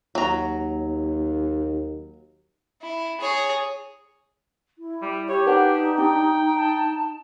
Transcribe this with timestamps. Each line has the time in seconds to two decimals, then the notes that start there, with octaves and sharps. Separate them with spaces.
0.15 D#2 F#3 A#5
2.82 E4
3.20 G#4 C#5
4.78 E4
5.02 G3
5.29 G4 C#5
5.46 D4 D#4 B4 F#5
5.98 D4 G5
6.55 A5